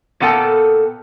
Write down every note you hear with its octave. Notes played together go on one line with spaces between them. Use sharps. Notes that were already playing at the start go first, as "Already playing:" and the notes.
A#2 A#3 B3 A4 G5 A5